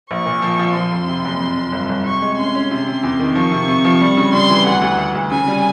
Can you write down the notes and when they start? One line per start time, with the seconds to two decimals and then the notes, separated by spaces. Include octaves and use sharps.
0.10 A#1 C#6
0.26 A#2
0.42 F3
0.59 F3
0.75 F3 C6
0.91 F2
1.08 C3
1.25 F#1
1.40 F2
1.57 F2
1.72 G1
1.89 G1
2.05 C3 C#6
2.22 G#3
2.37 C#4 C6
2.55 C#4
2.71 C3 C6
2.88 C3
3.03 E2
3.20 D#3
3.35 F3 C#6
3.52 C3
3.68 C3
3.85 F3
4.01 G3
4.17 C#3
4.33 G3 C6
4.50 E3
4.66 D2 F#5
4.82 D2
4.98 D2
5.15 D2
5.31 C#3 G#5
5.48 G3